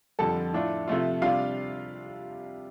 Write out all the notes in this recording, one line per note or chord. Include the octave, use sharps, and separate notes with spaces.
F2 D3 G3 A4 A5
A2 A3 D4 F4
C3 F3 A3 F4
C3 G3 D4 F4 F5